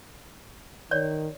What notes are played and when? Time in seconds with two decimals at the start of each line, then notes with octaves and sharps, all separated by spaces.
0.91 D#3 C#5 D5